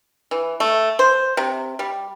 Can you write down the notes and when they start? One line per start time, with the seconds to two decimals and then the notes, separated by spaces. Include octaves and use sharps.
0.31 E3
0.60 A3
0.99 C5
1.37 C3
1.79 G3